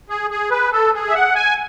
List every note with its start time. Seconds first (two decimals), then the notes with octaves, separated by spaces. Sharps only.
0.10 G#4
0.31 G#4
0.51 B4
0.72 A4
0.94 G#4
1.09 E5
1.15 F#5
1.35 G#5